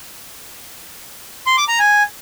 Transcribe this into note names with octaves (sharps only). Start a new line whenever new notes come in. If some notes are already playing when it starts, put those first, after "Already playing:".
C6
D6
A#5
G#5